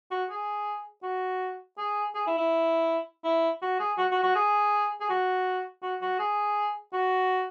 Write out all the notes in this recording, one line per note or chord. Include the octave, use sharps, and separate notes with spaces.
F#4
G#4
F#4
G#4
G#4
E4
E4
E4
F#4
G#4
F#4
F#4
F#4
G#4
G#4
F#4
F#4
F#4
G#4
F#4